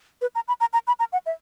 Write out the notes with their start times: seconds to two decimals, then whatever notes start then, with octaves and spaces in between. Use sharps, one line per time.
0.22 B4
0.35 A#5
0.48 B5
0.60 A#5
0.73 A#5
0.87 B5
0.99 A#5
1.13 F#5
1.26 E5